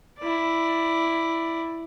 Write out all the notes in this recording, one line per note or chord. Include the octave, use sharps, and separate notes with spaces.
E4 D5